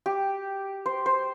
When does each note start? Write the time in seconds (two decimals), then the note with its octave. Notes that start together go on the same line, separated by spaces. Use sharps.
0.06 G4
0.86 C5
1.06 C5